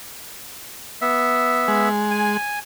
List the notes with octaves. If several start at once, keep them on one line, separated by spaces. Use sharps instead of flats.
B3 E5
G#3
G#5